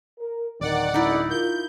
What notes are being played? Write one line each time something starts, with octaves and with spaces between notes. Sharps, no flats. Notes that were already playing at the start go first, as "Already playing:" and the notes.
A#4
D1 D#3 D5 F#5
F#2 D3 G#3 D#4 E4
F4 A#4 G6